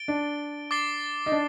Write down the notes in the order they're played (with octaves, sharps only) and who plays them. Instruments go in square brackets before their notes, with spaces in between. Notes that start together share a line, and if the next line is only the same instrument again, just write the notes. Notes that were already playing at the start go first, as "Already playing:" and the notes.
Already playing: [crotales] A6 D7 G7
[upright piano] D4
[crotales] D6 A6 C7 G7
[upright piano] D#4
D4